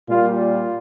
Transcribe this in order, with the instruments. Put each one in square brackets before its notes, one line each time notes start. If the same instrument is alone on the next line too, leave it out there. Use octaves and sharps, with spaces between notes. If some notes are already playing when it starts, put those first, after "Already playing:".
[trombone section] A#2 G3 A#3 F4
F4